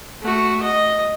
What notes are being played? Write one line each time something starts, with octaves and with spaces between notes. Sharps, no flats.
A3 F#4
D#5